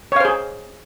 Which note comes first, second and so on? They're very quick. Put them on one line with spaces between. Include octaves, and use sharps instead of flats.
C#5 F5 C5 G#4